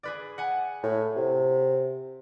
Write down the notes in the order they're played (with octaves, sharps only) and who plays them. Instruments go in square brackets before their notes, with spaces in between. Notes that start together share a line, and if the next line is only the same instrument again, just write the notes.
[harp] G#4 B4 D5
F#5 G#5
[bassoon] A2
C3